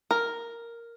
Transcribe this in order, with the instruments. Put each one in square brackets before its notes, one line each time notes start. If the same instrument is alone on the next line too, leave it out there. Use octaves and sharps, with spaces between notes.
[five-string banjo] A#4